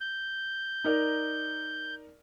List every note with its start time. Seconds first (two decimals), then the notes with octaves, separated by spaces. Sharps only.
0.01 G6
0.84 D#4 A#4 D5